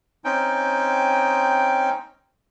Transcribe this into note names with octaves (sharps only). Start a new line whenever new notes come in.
C4 C#4 D#4 G5